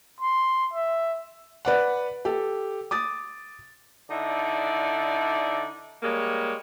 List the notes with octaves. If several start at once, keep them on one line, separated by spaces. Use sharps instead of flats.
C6
E5
B4 D5 F#5
G4 A4
D6 D#6 A6
D3 D#4 E4 D5
G3 G#3 A#3 C#5